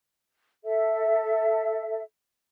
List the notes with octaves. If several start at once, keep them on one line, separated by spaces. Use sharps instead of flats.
A4 E5